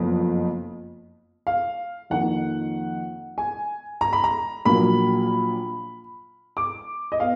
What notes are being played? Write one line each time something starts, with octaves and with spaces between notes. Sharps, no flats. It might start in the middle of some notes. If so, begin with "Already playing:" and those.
Already playing: F#1 F2 F3 B3
F5
F2 D#3 A#3 F#5
G#5
A#5
B5
A#5
A#1 A#2 F#3 A#3 B5
D6
D#5
B3 F5